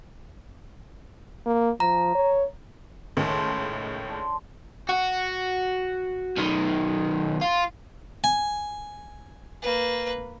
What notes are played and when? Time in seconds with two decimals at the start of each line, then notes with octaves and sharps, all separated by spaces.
1.46 A#3
1.80 F3 A#5
2.15 C#5
3.17 C#2 A2 D#3 C5 A5 D#6
4.10 D4 C6
4.89 F#4
6.37 B1 D#3
7.41 F4
8.24 G#5
9.62 A#3 B4